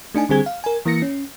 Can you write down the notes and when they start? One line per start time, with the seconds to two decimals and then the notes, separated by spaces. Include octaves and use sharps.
0.14 A3 D4 D#4 G#5
0.29 D3 G3 C4 G#4 G#6
0.46 F5
0.64 A#4 G#5
0.85 E3 A#3 A#6 C#7
1.02 C#4